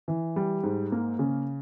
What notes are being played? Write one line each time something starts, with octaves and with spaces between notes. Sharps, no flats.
E3
G3
G#2
A#3
C#3